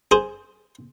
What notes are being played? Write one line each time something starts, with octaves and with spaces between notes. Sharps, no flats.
G#4 C5